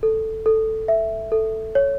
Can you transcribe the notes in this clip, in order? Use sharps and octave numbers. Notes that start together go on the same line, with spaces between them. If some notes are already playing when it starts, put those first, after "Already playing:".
A4
A4
E5
A4
C#5